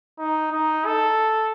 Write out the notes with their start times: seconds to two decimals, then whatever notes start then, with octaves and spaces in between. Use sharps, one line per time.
0.19 D#4
0.52 D#4
0.86 A4